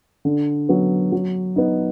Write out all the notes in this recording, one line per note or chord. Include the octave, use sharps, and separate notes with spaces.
D3
F#3 B3
F#3
B3 D#4